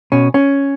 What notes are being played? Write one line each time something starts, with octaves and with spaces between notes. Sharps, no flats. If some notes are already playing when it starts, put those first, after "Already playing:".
B2 C#4
C#4